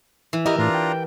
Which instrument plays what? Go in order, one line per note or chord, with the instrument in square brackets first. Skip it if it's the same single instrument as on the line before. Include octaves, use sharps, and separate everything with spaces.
[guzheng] E3
[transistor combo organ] E3 D#5 [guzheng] E4 G4 A#4 [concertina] A#5
[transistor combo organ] A2 [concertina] D4 F4 A#5
[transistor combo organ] G5